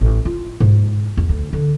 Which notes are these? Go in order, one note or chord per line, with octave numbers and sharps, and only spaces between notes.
A1
F4
G#2
E2
D2
D3